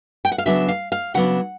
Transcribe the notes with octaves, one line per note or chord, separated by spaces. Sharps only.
G5
F#5
F5
C#3 F#3 B3 D4 E5
F5
F5
C#3 F#3 B3 D4 F#5